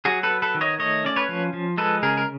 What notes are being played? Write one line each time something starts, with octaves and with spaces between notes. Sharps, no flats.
F#3 F#4 G#4
A4 B4
B3
A4 B4
D#3
C#5 D#5
A3 C#5 D#5
C#4 D5
B4 C#5
F3
F3
G#3 A4 B4
C#3 G#4 A#4
A#4